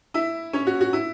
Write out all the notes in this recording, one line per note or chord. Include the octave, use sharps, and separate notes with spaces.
E4 E5
C#4 C#5
F#4
F#4
E4